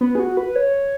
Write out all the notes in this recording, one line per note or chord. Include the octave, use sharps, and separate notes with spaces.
B3
G#4
F#4
B4
C#5